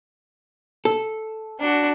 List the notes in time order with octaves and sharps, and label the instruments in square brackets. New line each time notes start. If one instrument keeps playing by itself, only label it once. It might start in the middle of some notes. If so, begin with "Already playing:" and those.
[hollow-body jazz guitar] A4
[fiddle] D4 F#4